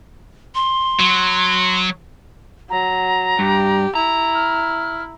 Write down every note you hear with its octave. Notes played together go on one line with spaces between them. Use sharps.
C6
F#3
F#3 A#5
G2 G4
E4 A#5
F6